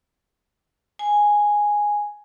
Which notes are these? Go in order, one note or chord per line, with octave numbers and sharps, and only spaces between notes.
G#5